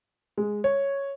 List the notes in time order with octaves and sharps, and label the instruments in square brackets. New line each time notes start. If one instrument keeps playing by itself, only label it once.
[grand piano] G#3
C#5